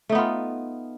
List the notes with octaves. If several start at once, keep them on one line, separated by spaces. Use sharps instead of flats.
A3 B3 D#4 F4